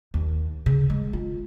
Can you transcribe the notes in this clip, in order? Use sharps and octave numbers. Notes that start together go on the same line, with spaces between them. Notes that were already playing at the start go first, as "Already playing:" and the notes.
D#2
C#3
G#3
F4